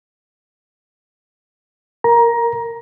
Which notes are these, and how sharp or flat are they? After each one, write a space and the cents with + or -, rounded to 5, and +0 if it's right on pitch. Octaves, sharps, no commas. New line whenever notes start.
A#4 +0 A#5 +15